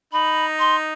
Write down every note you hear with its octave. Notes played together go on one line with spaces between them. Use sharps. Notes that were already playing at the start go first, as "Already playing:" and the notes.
D#4 B5
C6